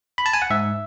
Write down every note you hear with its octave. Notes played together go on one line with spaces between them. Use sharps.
B5
A5
G#5
F#5
G#2 E5